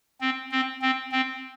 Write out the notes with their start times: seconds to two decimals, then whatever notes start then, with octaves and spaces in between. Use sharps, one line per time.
0.21 C4
0.52 C4
0.82 C4
1.12 C4